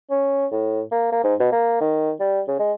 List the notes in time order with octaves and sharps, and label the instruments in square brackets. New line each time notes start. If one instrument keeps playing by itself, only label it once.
[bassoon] C#4
A2
A#3
A#3
G#2
B2
A#3
D#3
G3
C#3
G#3